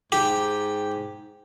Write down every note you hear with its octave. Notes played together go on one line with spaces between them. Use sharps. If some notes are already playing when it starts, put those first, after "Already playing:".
G#2 G4